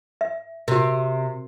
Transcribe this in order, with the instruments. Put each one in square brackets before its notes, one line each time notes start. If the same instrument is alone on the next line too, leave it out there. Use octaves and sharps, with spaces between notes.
[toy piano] E5
[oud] C3 [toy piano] F#4 A#4